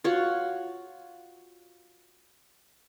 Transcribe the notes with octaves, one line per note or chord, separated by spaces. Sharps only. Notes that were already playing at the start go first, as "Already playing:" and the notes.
F4 F#4 C#5 F#5